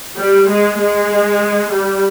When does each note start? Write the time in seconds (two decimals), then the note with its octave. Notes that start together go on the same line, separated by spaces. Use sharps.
0.18 G3
0.48 G#3
0.79 G#3
1.71 G3